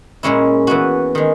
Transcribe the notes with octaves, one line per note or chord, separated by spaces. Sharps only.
A#2 G#3 C#4 E4
E3 B3 F#4
D#3 G#3